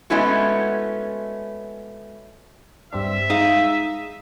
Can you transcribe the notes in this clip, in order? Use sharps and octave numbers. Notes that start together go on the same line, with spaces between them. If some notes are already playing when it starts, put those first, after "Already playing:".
G#3 A3 B3 C#4 E4 F#4
G2 C4 D4 E5
G#3 D#4 F5 D#6